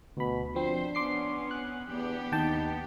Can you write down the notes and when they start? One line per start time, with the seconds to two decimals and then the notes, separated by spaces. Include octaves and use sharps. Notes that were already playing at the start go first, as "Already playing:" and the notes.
0.17 D2 B2 B5
0.55 F3 C4 D4 C5
0.95 B3 C#4 C6 D6 C7
1.51 F#6
1.89 E2 B3 D4 G4
2.32 D#2 D#4 G5 A5